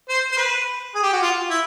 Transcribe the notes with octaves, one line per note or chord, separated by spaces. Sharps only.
C5
C5
B4
G#4
G4
F#4
F4
E4